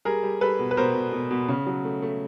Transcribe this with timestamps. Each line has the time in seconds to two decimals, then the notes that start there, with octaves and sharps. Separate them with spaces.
0.05 G3 G#4 A#4
0.23 G3
0.41 G3 A4 B4
0.59 B2
0.71 B4
0.77 B2 A#4 C5
0.95 B2
1.12 B2
1.30 B2
1.49 C#3
1.67 F#3
1.85 A3
2.02 A3